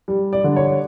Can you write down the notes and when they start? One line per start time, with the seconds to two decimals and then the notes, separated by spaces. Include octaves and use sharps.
0.08 G3
0.33 D5
0.44 D3
0.56 C#5